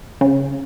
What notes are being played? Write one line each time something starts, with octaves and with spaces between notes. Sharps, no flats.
C#3